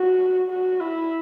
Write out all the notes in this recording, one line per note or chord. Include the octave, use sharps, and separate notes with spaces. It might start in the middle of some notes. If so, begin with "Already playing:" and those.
Already playing: F#4
F#4
E4